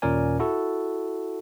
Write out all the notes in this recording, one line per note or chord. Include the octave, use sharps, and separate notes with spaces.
D#2 A#2 C#4 A#4 D5 G#5
E4 F#4 A4